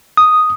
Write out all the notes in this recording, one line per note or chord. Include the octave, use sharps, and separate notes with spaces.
D#6